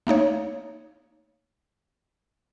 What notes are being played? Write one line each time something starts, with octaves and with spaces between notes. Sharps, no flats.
A3 A#3 D#4 C#5